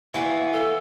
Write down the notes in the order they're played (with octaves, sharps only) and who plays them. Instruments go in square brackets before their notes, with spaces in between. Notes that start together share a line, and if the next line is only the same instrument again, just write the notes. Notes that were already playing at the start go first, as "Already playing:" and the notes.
[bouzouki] E3 B3 F#4 [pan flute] F5
[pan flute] A4